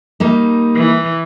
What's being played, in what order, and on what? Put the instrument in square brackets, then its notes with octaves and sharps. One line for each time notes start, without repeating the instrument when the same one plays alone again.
[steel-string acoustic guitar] G3 A#3 D#4
[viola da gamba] E3